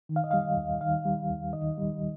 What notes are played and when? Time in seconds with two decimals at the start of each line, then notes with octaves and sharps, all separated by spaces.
0.09 D#3
0.16 F5
0.24 D#5
0.31 G3 F5
0.57 D#2
0.81 D#3 F5
1.05 G3
1.30 D#2
1.53 D#3 D#5
1.78 G3